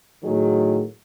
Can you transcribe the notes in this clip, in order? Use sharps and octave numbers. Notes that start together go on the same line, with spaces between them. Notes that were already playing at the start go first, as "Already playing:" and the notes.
A2 D#3 F#3 G#4